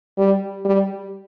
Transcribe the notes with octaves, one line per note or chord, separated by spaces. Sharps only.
G3
G3